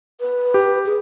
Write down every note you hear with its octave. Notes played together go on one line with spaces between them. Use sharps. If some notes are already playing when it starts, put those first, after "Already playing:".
B4
G4
G#4